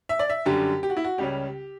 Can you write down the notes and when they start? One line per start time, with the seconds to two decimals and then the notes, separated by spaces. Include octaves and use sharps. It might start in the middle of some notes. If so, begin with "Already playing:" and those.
0.09 E5
0.19 D5
0.30 E5
0.45 F#2 D3 G3 G4
0.83 G4
0.90 F#4
0.97 E4
1.04 F#4
1.18 C#2 C#3 G3 C#4 G4